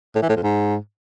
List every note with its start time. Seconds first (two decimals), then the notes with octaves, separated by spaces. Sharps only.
0.15 A2
0.22 E3
0.29 A2
0.36 F2
0.43 G#2